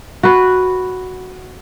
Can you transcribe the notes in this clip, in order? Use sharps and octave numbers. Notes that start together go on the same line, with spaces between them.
F#4 B4